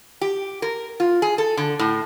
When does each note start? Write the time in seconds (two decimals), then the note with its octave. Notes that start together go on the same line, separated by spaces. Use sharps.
0.21 G4
0.62 A#4
1.00 F4
1.22 G#4
1.38 A4
1.57 D3
1.79 A2